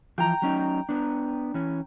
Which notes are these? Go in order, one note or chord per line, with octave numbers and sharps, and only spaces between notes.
E3 F3 G5 A#5
F#3 C#4 D#4
B3 D4
E3 C#4